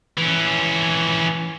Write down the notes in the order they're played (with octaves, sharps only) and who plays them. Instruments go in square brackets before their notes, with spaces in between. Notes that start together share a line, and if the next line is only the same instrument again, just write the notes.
[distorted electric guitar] E3 C#4